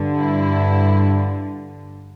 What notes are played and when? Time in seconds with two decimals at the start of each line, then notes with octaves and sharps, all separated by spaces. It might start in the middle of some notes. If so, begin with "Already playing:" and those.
Already playing: G2 D3
0.16 E4